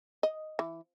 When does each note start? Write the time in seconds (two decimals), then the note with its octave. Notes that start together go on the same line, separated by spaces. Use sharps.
0.23 D#5
0.59 E3